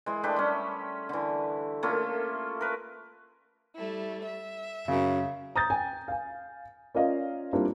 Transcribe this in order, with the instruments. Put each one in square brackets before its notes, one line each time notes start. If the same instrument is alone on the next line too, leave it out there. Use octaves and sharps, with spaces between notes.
[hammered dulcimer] E3 G#3
A3 D4 G4 B4
G3 C#4
D3 E3
A3 A#3 C#4 F4
A#4 B4
[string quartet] G3 A3 E4
E5
[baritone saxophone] F#2 [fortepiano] C#3
[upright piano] A#5 D#6 G6 A6
G5 G#5
F5 G#5
C#4 F4 A#4 D5 D#5 F5
G3 A#3 C4 D4 E4 F4